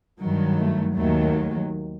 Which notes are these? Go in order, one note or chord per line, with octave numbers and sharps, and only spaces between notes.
G2 D#3 F#3
A3
D#2 D#3 F#3 A3